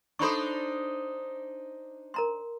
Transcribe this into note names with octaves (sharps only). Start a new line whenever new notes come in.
D4 D#4 A4 C5 B5 C#6
A#4 A#5 C6